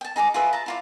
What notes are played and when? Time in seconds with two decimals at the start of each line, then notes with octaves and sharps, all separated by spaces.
0.01 G5 A5
0.16 D#4 G#4 A#5 D6
0.34 F4 G#4 B4 E5
0.53 A5 A#5
0.66 E4 F4 D5